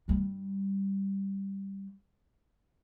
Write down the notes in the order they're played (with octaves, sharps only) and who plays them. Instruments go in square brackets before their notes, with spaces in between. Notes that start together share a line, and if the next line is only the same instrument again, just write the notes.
[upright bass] G2 G3